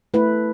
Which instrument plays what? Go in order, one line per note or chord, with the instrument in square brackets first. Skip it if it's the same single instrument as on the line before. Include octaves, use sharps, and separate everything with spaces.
[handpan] A3 E4 B4